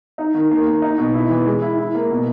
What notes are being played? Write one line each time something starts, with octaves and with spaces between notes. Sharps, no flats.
D#4
D#3
A#3
A#3
D#4
B2
E4
E3
G#3
E4
E4
A#3
B2